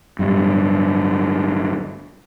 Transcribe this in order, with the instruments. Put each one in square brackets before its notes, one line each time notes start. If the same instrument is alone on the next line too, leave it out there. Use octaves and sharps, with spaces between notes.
[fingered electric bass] D1 G2